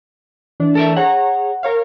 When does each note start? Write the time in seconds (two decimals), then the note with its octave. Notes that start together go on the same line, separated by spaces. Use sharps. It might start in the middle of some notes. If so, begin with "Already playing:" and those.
0.60 E3 D4
0.75 A4 A#4 E5
0.96 G#4 C#5 F#5 A#5
1.63 A#4 C#5 F5